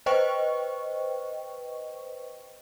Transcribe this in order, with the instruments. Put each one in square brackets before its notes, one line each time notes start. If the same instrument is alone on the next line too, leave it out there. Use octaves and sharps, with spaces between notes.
[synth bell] B4 C5 D#5 G5 C#6